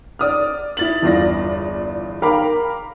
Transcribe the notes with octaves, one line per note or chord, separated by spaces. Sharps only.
D5 D#6 F6
E4 A6 F#7
G1 E2 F4 D5 A#6
A#4 F5 G5 A#5 B5 D6